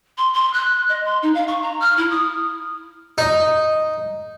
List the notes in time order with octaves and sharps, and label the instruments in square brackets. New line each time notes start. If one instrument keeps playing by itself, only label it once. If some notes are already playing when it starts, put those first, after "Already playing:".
[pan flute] C6
C6
F#6
D#5
C6
D#4
F5
C#6
A#5
F6
E4
D#6
[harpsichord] D#4